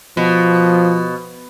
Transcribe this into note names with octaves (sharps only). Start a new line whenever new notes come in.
B2 F3